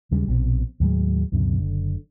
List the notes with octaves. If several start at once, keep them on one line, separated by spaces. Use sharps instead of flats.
D#2 C#3 G3 G#3
A#1 B2 E3 C4
D#2 A2 F#3 G#3
C#2 F#2 B2 D3
F#1 D3